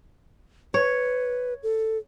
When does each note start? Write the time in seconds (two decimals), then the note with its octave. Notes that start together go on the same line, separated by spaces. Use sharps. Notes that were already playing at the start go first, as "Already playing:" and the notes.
0.74 B4 C#5
1.63 A4